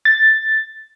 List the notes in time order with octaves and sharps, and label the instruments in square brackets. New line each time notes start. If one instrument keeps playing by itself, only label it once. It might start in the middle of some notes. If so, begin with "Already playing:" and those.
[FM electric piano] A6